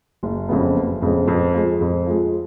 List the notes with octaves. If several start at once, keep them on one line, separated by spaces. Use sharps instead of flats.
F#1
F2 C#3 G#3 B3
F#1
F2 C#3 G#3 B3
F2
F3 G#3
F2
F3 G#3